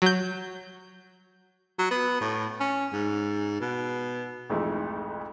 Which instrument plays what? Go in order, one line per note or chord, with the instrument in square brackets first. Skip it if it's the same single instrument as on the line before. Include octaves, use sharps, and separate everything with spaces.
[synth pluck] F#3 G6
[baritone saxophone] F#3
B3
A2
C#4
G#2
B2
[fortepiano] B1 F2 G#2 E3 A3 D#4